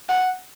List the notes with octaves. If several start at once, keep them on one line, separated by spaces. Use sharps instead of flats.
F#5